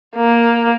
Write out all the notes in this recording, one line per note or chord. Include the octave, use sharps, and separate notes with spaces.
A#3